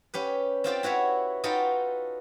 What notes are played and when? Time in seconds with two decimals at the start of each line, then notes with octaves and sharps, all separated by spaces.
0.14 C#4 G4 B4
0.64 C4 F4 G4 D5
0.83 E4 F#4 B4 C#5 E5
1.44 D#4 F4 F#4 A4 B4 G5